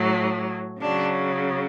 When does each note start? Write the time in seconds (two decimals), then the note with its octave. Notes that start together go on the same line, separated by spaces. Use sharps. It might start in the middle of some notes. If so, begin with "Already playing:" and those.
Already playing: A2 F#3
0.81 C#3 F#3 D4